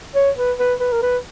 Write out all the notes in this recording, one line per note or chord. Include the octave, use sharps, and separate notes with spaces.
C#5
B4
B4
B4
A#4
B4